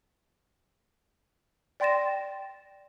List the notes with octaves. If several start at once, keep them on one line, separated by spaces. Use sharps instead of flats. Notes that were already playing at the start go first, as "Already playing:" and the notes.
D5 G5 C6 A6 A#6 E7